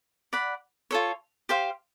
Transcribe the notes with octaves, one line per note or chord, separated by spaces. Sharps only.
D5 F#5 B5
F4 A4 C#5
G4 C5 F5